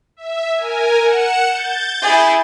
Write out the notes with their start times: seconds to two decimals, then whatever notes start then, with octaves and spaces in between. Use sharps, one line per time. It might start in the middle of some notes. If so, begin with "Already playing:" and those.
0.17 E5
0.55 A#4 G#5
1.03 F#5 C#7 E7
1.46 G6 A6
2.02 E4 G#4